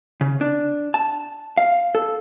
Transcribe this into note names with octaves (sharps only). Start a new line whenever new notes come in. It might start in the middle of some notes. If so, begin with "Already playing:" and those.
C#3
D4
A5
F5
A4